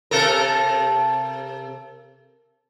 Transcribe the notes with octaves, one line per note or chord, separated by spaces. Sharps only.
C3 A4 A#4